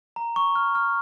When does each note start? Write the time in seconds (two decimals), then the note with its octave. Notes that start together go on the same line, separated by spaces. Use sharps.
0.16 A#5
0.36 C#6
0.56 F6
0.75 F6